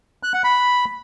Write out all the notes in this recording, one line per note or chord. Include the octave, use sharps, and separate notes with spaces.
F#6
F#5
B5